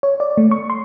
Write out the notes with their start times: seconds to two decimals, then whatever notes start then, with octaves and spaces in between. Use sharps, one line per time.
0.03 C#5
0.20 D5
0.37 A3
0.51 C#6
0.70 C6